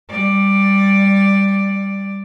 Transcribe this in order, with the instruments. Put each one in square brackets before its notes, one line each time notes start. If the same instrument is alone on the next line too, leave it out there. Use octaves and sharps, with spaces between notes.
[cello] G3 D5